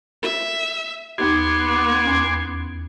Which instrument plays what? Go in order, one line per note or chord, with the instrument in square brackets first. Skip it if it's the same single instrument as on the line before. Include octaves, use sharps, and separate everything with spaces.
[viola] E5
[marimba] D#2 D#4 G4 [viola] B3 [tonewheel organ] C6 D6 G#6
[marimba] E2 C#4